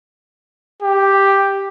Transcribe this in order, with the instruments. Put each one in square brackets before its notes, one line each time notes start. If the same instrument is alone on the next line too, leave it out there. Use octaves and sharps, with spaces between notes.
[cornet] G4